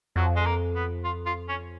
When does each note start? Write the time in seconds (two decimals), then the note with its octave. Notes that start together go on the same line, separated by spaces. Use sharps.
0.16 F2 F#3
0.36 G#3
0.46 A#3
0.75 B3
1.04 F4
1.26 F4
1.49 C#4